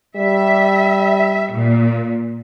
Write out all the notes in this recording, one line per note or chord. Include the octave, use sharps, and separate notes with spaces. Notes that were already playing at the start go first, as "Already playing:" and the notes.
G3 E5
A#2